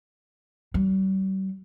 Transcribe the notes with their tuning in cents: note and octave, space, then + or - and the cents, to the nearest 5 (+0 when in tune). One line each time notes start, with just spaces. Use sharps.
G3 -40